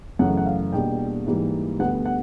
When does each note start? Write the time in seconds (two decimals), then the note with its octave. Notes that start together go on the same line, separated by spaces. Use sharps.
0.19 F#2 C#3 E3 A3 F#5
0.37 F#5
0.46 F5
0.73 E2 B2 G3 A#3 D4 G5
1.26 G#2 E3 G3 A#3
1.79 D2 D3 G3 B3 F#5
2.06 F#5